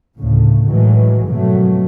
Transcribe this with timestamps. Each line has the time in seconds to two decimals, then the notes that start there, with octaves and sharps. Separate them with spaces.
0.15 D2 A2 C#3
0.65 A2 D#3 E3 F#3 G#3
1.25 F2 G#2 B2 D#3 F#3 A3